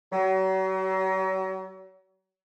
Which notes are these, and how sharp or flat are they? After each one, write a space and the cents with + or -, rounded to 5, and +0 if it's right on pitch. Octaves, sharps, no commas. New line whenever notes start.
F#3 +40